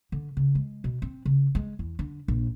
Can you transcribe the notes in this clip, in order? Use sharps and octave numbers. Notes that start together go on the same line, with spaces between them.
D3
C#3
G#3
B2
C4
C#3
G#3
E2
D3
A#1